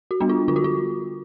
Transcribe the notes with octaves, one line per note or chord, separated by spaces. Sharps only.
F#4
G3 B3 D4
F4
D3 F4
F#4
F4